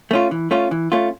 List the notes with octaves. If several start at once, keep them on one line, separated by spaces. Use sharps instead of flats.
A3 C#4 F4
E3
A3 C#4 F4
E3
A3 C#4 F4